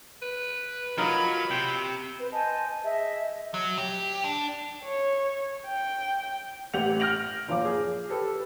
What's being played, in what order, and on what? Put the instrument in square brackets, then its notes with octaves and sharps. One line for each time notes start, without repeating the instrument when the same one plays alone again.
[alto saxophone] B4
[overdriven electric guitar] F#3 [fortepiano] D#4 A#4 [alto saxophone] F4 [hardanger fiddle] B5
[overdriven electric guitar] C3 [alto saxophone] G5
[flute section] B4 C5
C5 D#5 G#5 A5
G#4 D#5 E5
[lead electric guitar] F#3
G4
D4
[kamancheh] C#5
G5
[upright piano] A1 G4 F#5 G6 F7
F6 G6 A#6 D7 F7 F#7
F#1 F3 F5 D6
G#4
G4 A4 B4